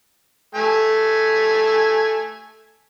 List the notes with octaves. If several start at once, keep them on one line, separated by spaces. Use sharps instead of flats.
A3 G#5